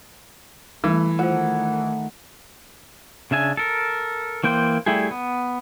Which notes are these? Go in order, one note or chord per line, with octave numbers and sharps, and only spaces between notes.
E3 G3 A3
D#3 A3 F4 C5 F#5
C#3 D4 E5 G#5
A4 A#4
E3 A#3 C5 G5
G3 A3 E4 G4 G#4
B3